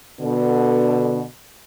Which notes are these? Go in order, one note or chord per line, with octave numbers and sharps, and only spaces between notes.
B2 D3